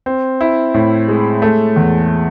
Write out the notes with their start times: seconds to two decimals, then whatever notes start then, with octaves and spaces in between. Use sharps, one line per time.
0.06 C4
0.41 E4
0.74 A2
1.08 G#3
1.42 A3
1.76 E2